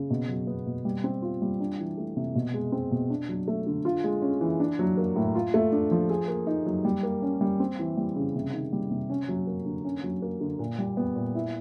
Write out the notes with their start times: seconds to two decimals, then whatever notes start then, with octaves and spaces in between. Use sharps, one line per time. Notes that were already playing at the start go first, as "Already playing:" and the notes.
Already playing: C#3
0.10 B2
0.29 F#3
0.47 B3
0.66 B2
0.85 G3
1.04 C4
1.22 F4
1.42 G3
1.60 D4
1.79 E3
1.98 A3
2.17 C3
2.35 B2
2.54 G#3
2.72 C4
2.91 B2
3.10 D4
3.29 F#3
3.48 A3
3.67 D3
3.85 F4
4.04 G#3
4.22 C#4
4.41 E3
4.60 D4
4.79 F#3
4.98 A#3
5.16 A2
5.35 F4
5.54 A3
5.72 D4
5.91 F3
6.10 G#4
6.28 A#3
6.47 D#4
6.66 F#3
6.85 G3
7.03 A#3
7.22 C#4
7.41 G3
7.60 C4
7.79 E3
7.97 G3
8.16 C#3
8.35 C3
8.53 D#3
8.73 G3
8.91 C3
9.10 C#4
9.29 F#3
9.47 A#3
9.66 D3
9.85 C#4
10.04 F#3
10.22 A#3
10.41 D3
10.59 A#2
10.79 G3
10.97 B3
11.16 A#2
11.35 E4